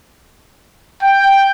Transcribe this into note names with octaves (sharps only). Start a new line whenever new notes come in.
G5